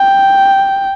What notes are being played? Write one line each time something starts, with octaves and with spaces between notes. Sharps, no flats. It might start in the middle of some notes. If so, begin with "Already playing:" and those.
Already playing: G5